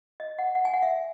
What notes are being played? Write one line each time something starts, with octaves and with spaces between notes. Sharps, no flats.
D#5
F#5
F#5
G#5
F#5
E5